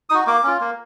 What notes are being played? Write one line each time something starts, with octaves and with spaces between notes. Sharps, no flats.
D#4 F#4 D#6
A#3 D6
C#4 F4
A#3